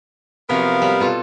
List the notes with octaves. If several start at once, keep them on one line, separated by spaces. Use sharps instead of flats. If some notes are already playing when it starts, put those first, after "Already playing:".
C3 F3 F#3 B3 A#4 F5
G3
B2 F4 A4